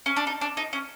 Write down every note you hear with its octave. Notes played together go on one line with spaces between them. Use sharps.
C#4
D4
D#4
D4
D#4
C#4